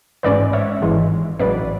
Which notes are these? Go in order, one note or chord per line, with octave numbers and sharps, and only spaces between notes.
A1 G#2 G#3 C#4 B4 D5
C#5 E5
G#1 G#2 E3 G#3
A1 G#2 F#3 B4 D5